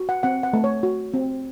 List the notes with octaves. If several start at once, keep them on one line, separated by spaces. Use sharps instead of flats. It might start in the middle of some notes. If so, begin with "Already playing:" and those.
Already playing: F#4
F#5
C4 F#5
F#5
A3
C#5
F#4
C4